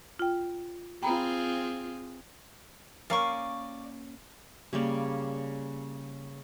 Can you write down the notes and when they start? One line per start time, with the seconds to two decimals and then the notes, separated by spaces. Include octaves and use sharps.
0.19 F4 G5
1.03 C4 F4 G#4 G5 A#5 B5
3.10 A#3 C#4 D5 F5 C#6
4.73 C#3 G3 A#3 D5